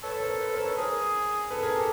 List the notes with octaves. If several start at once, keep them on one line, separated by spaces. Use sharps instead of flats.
A4 B4 C#5
A#4 C5
B4 C#5
A#4 C5
B4 C#5
G#4 A#4 C5
A4 B4
G#4 A#4
G4 A4